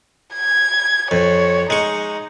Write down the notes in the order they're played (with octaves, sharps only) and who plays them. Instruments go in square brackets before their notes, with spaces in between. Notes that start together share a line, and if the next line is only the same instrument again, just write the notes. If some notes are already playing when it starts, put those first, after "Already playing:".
[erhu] G#6
[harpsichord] F2 [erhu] C#5
[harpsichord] G#3 C#6 [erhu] D#4